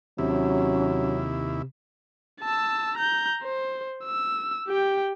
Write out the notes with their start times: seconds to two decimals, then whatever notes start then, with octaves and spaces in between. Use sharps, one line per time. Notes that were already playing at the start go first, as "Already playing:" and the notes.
0.18 D#2 C3 F#3 C#4 E4
2.41 A5 E6
2.97 A#5 G6
3.44 C5
4.05 E6
4.68 G4 G5